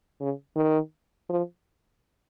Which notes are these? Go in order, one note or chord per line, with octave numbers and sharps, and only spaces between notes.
C#3
D#3
F3